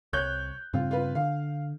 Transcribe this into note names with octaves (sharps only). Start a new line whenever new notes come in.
C2 C#5 F#6 G6
G2 C#3 C4 F4
F4 B4
D3 F5